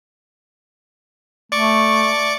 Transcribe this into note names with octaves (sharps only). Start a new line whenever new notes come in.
A3 D5 C#6 D6